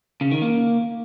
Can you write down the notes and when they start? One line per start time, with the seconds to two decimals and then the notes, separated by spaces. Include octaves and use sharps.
0.21 C#3
0.31 D#3
0.42 A#3